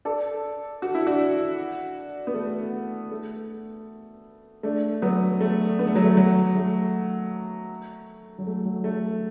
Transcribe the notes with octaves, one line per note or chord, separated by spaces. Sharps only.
A4 D5
F#4
E4
D4 F#4
B3
A3
A3
A3 D4
F#3 B3
A3
B3
A3
F#3
A3
F#3
A3
F#3
A3
F#3
A3